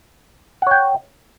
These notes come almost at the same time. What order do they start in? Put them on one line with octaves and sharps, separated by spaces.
F#5 C#5 G5